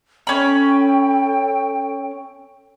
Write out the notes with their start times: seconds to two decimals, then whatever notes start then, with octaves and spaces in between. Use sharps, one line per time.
0.27 C#4 A4 G5 B5